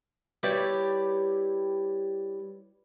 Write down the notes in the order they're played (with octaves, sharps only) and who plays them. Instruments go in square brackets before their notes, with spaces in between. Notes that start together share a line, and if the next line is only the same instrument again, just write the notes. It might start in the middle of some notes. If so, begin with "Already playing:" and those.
[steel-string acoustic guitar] G3 E4 G4 B4 C#5 D5